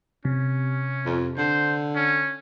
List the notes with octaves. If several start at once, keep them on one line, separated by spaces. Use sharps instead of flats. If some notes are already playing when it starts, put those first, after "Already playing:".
C3 C#4
F2
D3 C5
C#4